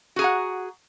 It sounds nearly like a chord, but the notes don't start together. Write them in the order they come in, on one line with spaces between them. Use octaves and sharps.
F#4 G#4 A#5 F#5